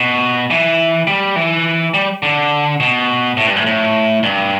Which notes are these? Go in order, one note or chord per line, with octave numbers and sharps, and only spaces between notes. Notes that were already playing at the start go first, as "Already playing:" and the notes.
Already playing: B2
E3
G3
E3
G3
D3
B2
A2
G2
A2
A2
G2